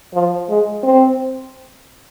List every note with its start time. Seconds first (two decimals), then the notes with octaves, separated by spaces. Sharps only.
0.14 F3
0.49 G#3
0.83 C4